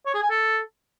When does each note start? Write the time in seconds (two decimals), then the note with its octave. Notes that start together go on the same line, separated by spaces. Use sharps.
0.06 C#5
0.14 G#4
0.22 G#5
0.30 A4